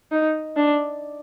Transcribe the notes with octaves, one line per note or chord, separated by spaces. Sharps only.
D#4
D4